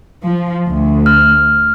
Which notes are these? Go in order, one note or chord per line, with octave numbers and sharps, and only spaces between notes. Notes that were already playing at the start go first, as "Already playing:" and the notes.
F3
D2
F6